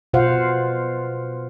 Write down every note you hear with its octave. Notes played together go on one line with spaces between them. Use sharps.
B2 F4 C5 F5 F#5